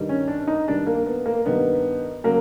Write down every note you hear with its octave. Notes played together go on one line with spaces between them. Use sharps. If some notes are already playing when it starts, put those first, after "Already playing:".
Already playing: G2 D#3 G3
C#4
D4
D#4
G2 D#3 G3 D4
A#3
B3
A#3
G2 D#3 G3 B3
C#3 F#3 A#3